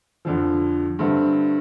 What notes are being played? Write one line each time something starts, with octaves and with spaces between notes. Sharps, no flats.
F2 D3 F3
G2 D3 A3 C4